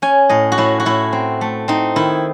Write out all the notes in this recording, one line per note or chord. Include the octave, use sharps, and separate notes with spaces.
C#4 G#5
A2 D#5
F#4
A2 E4
F#4
A2 E4
C4
A3
C4 D#4
D#3 E4